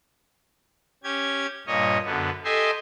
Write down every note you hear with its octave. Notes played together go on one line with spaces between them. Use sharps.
C#4 G4 G#6
G2 A#2 C#5 D#5
F#2 D3 B3
G4 A4 D#5 E5 G#5 C6